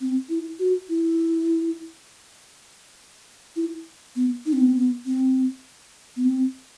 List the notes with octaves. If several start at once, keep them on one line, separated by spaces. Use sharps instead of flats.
C4
E4
F#4
E4
E4
B3
D#4
C4
B3
C4
B3
C4
B3
C4